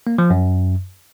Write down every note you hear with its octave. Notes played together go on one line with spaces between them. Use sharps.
A#3
F3
F#2